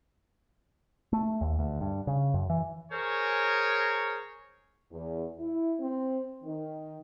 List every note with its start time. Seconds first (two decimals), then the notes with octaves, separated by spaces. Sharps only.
1.13 A3
1.41 D#2
1.59 D2
1.81 G2
2.07 C#3
2.34 F#2
2.50 E3
2.92 G#4 A#4 C5 C#5
4.91 E2
5.39 E4
5.80 C4
6.43 D#3